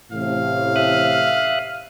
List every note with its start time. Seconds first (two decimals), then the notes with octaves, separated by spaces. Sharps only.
0.12 A1 A2 C3 F5
0.76 E5 D#6 F#6